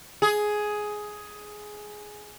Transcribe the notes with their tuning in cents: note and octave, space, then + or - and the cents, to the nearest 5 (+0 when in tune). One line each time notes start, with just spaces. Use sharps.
G#4 +10